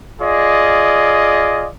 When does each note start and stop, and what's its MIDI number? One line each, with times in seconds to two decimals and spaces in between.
0.22 1.68 65
0.22 1.68 68
0.22 1.68 74
0.22 1.68 75